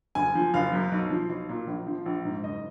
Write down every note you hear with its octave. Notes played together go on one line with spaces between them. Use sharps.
F#1 G#5
F3
F#1 F5
F#2
B1
F3
B1
A#2
A#1
F3
A#1
G#2
F#1 D#5